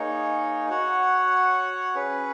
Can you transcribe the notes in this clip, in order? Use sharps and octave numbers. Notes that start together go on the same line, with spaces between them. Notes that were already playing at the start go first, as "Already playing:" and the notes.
Already playing: A#3 D#4 G#4 C#5
F#4 C#5 F#5
C#4 G#4 B4